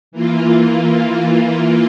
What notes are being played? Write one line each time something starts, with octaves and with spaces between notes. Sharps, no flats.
E3 A#3 F4